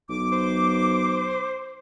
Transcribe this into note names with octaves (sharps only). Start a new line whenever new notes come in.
B1 D6
C5